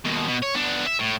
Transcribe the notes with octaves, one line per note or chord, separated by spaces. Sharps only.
D#2 B2
B2
C#5
B3 D4
E5
A2